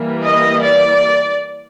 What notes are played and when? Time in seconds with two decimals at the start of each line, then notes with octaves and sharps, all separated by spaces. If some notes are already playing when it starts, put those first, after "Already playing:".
Already playing: E3 G3 A#3
0.23 D#5
0.62 D5